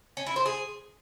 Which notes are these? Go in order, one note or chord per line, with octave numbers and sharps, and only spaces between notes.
C#4
E4
C5
G#4